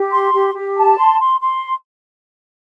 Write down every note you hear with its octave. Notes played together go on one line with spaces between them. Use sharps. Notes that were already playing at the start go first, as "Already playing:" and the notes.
Already playing: G4
C6
G4
G4
A5
C6
C6
C6